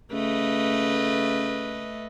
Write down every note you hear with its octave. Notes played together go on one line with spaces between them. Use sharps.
C#3 A3 B4 D#5